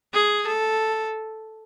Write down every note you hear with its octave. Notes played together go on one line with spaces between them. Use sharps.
G#4
A4